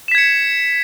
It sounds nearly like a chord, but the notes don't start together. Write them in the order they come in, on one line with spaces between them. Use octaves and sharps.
E7 B6 G#6 C#7